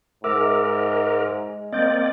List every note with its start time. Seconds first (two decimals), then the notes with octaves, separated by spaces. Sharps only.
0.24 G#2 G#3 A#4 E5 D6 E6
1.73 A#3 C4 D5 D#5 G6